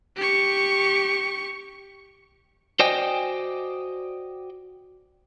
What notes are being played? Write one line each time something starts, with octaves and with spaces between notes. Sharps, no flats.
G4 C#6
F#4 C5 D5 D#5 G5 G#5